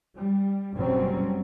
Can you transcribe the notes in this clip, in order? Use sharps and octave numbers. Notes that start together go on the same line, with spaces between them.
G3
F#1 B2 F#3 G3 C4 C#4